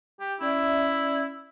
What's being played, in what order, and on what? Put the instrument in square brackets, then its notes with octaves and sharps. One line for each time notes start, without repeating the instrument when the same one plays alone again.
[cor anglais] G4
[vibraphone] C#4 D5 E5 [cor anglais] E4